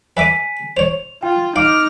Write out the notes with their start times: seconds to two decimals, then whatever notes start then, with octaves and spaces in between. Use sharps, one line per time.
0.17 B4 E5 G#5 D6 B6 D#7
0.77 C5 C#5 F7
1.23 F4 G5
1.56 D#4 F5 D6 F6 D7